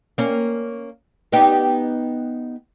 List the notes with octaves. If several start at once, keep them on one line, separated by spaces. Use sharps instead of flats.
A#3 C#4
B3 D#4 G4